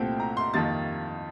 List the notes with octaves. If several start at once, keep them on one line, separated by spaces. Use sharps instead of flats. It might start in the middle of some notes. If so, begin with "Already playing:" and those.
Already playing: C2 A#2 A3 C4 G5
A#5
C6
F2 D#3 G3 A#3 A6